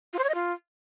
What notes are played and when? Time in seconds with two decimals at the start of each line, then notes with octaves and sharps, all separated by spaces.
0.13 F4
0.19 C5
0.24 C#5
0.29 D#5
0.35 F4